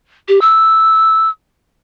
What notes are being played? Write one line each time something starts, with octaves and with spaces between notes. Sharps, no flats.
G4
E6